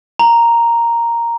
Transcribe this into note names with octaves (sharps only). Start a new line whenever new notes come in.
A#5